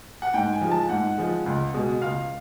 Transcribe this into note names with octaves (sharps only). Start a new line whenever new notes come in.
F#5
G#2 G5
G#5
F3 G#3
A5
G#2 F#5
F3 G#3
C#2
B2 G#3
C#2 F5